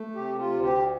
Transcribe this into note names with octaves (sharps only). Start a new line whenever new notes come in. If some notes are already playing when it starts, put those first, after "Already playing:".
Already playing: A3
C3 G4
F4
D2
G4